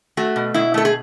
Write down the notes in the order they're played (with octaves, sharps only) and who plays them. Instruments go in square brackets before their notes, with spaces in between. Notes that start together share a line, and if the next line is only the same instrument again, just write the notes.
[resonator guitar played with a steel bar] A3 F#4
B2
B2 E4
A3 A4
G#4